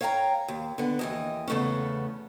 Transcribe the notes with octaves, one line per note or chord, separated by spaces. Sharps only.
C#5 F5 G5 G#5 A#5
D#2
D3 B3
D#2 E3 D#5
E2 C#3 A3 B3 C#4